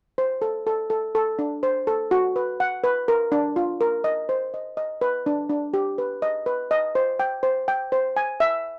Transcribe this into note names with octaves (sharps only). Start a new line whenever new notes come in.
C5
A4
A4
A4
A4
D4
C5
A4
F#4
B4
F#5
B4
A#4
D4
F4
A#4
D#5
C5
D#5
D#5
B4
D4
D4
G4
B4
D#5
B4
D#5
C5
G5
C5
G5
C5
G#5
E5